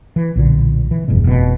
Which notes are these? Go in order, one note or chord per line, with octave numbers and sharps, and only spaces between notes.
E3
B1 A#2 D3
E3
F1 E2 G2 B2
F1 B2